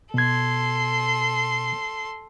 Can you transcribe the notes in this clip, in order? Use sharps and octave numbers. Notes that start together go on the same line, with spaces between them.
B2 A4 C6 G#6